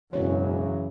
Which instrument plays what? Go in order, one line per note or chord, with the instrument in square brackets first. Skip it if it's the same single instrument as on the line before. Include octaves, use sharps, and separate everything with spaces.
[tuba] E1 [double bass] F#2 F#3 [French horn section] C#3 E3 [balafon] C#5